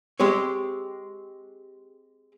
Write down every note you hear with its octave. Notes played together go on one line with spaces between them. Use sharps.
G#3 C4 G4 C#5